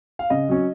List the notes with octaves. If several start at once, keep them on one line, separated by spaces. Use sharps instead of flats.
F5
C#3 D#5
F#3 C#4